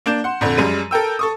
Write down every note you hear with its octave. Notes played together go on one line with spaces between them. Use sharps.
A#3 D4 G6 E7
F#5 C6
A#1 F2 D3
F#2 G3 G#3 D#7
A4 A#4 G5 E6
A4 C#6 D#6